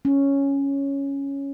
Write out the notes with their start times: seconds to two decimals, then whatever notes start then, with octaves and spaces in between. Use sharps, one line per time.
0.05 C#4